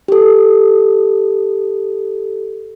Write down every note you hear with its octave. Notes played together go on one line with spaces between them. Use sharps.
G4 A4